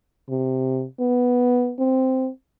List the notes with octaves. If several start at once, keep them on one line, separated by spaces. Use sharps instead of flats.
C3
B3
C4